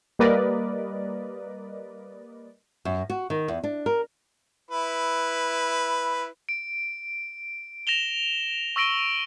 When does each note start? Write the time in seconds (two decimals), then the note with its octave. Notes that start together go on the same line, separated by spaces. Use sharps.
0.19 G3 A#3 A#4 B4 D5 D#5
2.85 F#2
3.10 F#4
3.30 D#3
3.48 E2
3.64 D4
3.86 A#4
4.71 E4 B4
6.49 D7
7.87 A#6 E7 F7 G7
8.76 C#6 E6 A#6 D7 G7